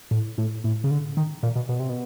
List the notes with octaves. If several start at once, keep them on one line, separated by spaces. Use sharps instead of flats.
A2
A2
A2
C#3
D3
D#3
A#2
B2
B2
C3
B2